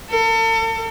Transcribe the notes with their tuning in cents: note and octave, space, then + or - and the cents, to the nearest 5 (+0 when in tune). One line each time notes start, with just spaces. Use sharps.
A4 +40